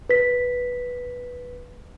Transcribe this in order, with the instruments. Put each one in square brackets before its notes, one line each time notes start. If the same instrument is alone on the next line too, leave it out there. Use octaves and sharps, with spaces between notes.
[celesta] B4 B6